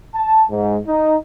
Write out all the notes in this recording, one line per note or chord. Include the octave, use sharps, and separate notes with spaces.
A5
G#2
D#4